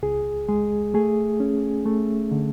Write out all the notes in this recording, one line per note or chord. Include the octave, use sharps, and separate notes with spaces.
C#2 G#4
G#3 G#4
A3 G#4
C#4
A3
D3